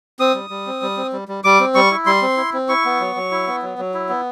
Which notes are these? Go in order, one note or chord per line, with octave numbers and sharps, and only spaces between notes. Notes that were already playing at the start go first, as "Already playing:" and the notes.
C4 D#6
G3
G3
C4
G3
C4
G3
G3
G3 D6
C4
G3 C#6
E4
G3 C6
C4
E4
C4
E4 C#6
B3
F#3
F#3
E4
B3
F#3
F#3
E4
B3